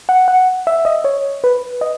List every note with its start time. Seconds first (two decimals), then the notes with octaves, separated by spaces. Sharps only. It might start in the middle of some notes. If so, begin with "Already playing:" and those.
0.09 F#5
0.28 F#5
0.67 E5
0.85 D#5
1.04 C#5
1.44 B4
1.81 D#5